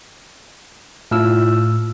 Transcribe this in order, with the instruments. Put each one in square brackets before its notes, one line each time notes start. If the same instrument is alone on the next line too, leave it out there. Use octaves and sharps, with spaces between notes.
[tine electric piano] A2 E6 [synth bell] E4 F4